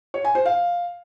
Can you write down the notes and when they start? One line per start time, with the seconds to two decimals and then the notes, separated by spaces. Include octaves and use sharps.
0.14 C#5
0.24 G#5
0.35 C5
0.46 F5